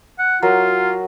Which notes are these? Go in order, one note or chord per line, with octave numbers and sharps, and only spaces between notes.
F#5
F#3 F4 A#4 F#5